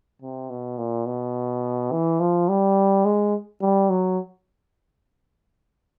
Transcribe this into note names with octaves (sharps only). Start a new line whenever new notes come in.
C3
B2
A#2
B2
E3
F3
G3
G#3
G3
F#3